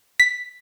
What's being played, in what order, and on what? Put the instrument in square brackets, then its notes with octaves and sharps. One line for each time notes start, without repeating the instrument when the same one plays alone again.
[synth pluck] B6